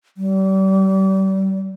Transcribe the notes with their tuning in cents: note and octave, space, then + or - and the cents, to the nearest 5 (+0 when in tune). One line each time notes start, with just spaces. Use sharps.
G3 -35